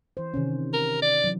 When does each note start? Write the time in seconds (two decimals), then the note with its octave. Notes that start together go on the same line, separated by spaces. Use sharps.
0.17 E3 C5
0.34 C3 D#3 C#4
0.74 A#4
1.02 D5
1.24 E3 F#3